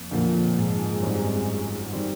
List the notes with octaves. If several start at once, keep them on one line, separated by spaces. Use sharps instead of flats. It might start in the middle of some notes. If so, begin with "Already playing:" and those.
Already playing: F2 A#3
F2 A#2 D3 F3 A#3
G#2
G#1 F#2 D#3 G3 C4
D#3 G3 C4